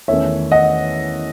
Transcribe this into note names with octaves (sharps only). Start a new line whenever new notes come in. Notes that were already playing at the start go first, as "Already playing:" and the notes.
E2 D#3 A3 C#4 C#5 E5
D#5 F#5